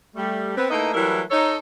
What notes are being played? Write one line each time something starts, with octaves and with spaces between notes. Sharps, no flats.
G3 A3
B3 C4
A3 A#3 D#4 E4 B4 D#5
E3 F#3 G3 A3 E4 A#4
D#4 A4 C#5